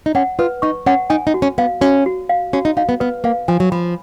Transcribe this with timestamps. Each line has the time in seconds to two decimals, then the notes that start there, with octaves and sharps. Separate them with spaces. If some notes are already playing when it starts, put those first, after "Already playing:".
0.06 D#4
0.15 C#4 F#5
0.39 F4 B4
0.62 D#4 C#6
0.86 C#4 F#5
1.10 D#4 G#5
1.27 D#4
1.34 F#4
1.42 C#4
1.58 B3 F5
1.81 C#4 F#4
2.06 F#4
2.29 F5
2.53 C#4 F#4
2.65 D#4
2.77 D#4 F5
2.89 B3
3.00 B3 B4
3.24 A#3 F5
3.48 F3 G#5
3.60 F#3
3.72 F3 B5